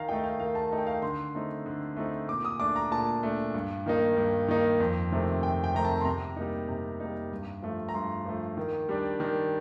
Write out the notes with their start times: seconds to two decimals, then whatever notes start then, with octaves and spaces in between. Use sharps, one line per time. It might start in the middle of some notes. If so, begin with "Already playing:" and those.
Already playing: D#3 F5 A#5
0.09 A3 D#4 G5
0.24 F5
0.40 D#3 F5
0.55 A5
0.71 A3 D#4
0.78 G5
0.87 F5
1.02 D3 C6
1.35 A3 C4 D#4
1.66 D3
1.97 A3 C4 D#4
2.28 A#2 D6
2.45 D#6
2.60 A3 D4 D6
2.76 A#5
2.91 A#2 A5
3.23 A3 D4
3.54 G2
3.86 D#3 A#3 D#4
4.17 G2
4.48 D#3 A#3 D#4
4.80 F2
5.12 C3 D#3 A3 C4
5.43 F2 G5
5.64 G5
5.74 C3 D#3 A3 C4 A#5
5.85 A5
6.01 C6
6.05 C3 A#5
6.36 G3 A#3 D#4
6.69 C3
7.00 G3 A#3 D#4
7.32 G2
7.63 F3 A3
7.89 A#5
7.95 G2 C6
8.25 F3 A3
8.57 D#3
8.89 G3 D4
9.20 D#3